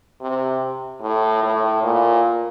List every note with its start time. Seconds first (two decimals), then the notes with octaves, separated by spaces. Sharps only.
0.21 C3
1.02 A2
1.43 A2
1.83 A#2